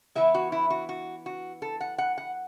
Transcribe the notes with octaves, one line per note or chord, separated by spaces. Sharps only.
E3 B3 E4 E5
F#4
E4
F#4
F#4
F#4
A4
F#5
F#5
F#5